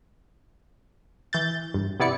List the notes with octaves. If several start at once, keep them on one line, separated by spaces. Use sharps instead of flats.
E3 G6 A6
G2
C3 B3 E4 D5 C#7